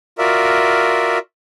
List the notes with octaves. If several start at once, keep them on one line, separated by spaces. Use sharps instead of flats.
F4 F#4 A#4 D5 E5